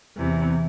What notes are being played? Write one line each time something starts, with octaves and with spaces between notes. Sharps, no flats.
E2 C3 E3